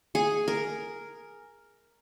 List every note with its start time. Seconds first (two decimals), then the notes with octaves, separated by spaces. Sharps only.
0.15 G#4
0.48 A#4